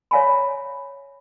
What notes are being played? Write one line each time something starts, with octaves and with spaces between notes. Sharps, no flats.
C#5 E5 F5 G#5 A#5 B5